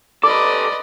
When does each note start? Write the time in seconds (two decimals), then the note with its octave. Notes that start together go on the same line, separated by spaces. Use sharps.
0.23 A4 B4 D5 D#5 D6